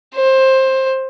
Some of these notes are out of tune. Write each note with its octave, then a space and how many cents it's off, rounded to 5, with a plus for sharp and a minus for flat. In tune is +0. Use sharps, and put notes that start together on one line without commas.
C5 +15